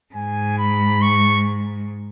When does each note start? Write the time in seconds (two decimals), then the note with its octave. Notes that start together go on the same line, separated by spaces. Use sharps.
0.14 G#2 G#5
0.58 B5
1.02 C#6